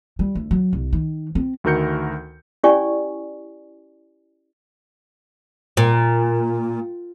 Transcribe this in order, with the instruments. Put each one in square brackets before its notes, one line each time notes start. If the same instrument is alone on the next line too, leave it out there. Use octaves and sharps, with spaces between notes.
[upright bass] G3
D2
F#3
C2
D#3
C4
[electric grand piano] D2 D#3 F#4 A#4 G6 C#7
[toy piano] C#4 E4 G4 D5 G#5 C#6
[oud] A#2